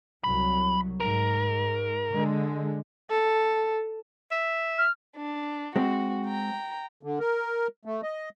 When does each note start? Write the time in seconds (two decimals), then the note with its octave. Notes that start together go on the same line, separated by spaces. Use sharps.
0.24 C2 F#3 B5
1.00 G#2 A#4
2.14 D3 G#3
3.10 A4
4.31 E5
4.78 F6
5.16 D4
5.76 G#3 C4 F#4
6.26 G5 A#5
7.03 D3
7.20 A#4
7.85 A3
8.03 D#5